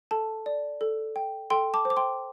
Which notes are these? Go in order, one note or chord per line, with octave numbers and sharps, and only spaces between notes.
A4 A5
D5
A4
G5
A4 G5 C6
A5 D6
C5
D6
G5 C6